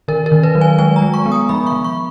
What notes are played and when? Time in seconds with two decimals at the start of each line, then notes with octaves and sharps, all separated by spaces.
0.08 D#3 A#4
0.26 A#4
0.32 D#3
0.43 B4
0.55 F#3
0.61 G#5
0.78 G#3 G#5
0.96 A#5
1.02 G#3
1.14 C#6
1.26 B3
1.32 D#6
1.49 F3 B5
1.67 C#6
1.72 F3
1.84 C#6